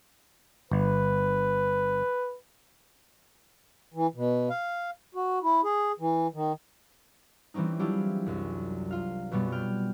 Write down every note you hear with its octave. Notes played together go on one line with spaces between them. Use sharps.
G1 B4
E3
B2
F5
F#4
E4
G#4
E3
D#3
E3 G3 C4 C#4 D#4
F#3 D4 E4 F4 G4 G#4
C2 F#2
F4 F5
F#2 B2 G3 B3
G5 F6